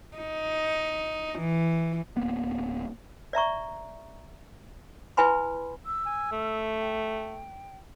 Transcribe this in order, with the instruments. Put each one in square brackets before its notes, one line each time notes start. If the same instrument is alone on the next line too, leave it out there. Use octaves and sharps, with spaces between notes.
[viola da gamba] D#4
E3
[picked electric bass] D1 A#3 B3
[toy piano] D5 E5 A#5 C#6
E4 B4 G#5 B5 C6
[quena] E6
[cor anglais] G#5
A3
[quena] G5